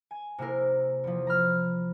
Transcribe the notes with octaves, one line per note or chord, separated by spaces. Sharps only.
G#5
C3 A#3 E4 A#4
E2 F3
A#5 B5 F6